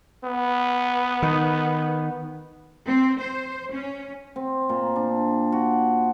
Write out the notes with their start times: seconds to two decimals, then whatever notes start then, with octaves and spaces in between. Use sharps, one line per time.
0.24 B3
1.22 D#3
2.86 C4
3.21 C5
3.72 C#4
4.36 C4
4.69 A#2
4.96 D4
5.52 F#4